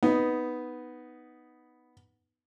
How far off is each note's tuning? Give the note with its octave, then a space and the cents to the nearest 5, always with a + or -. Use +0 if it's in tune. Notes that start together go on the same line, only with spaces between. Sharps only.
B3 +0 D#4 +0